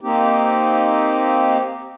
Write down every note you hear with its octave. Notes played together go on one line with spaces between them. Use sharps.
A#3 C4 D#4 G4